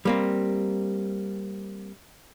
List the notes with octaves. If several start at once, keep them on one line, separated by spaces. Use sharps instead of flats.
G3 A#3 C4